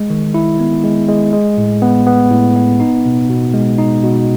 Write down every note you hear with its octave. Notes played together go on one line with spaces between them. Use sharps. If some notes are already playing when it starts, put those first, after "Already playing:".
Already playing: G#3
D#3
E4
B3
G#3
G#3
G#3
A2
B3
B3
A2
B3
D#4
B2
B2
G#3
D#4
B2